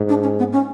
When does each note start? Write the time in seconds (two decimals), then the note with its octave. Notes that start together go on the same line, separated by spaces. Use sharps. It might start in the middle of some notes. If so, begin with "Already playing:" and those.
Already playing: G#2
0.09 D4
0.23 C#4
0.38 B3
0.52 C#4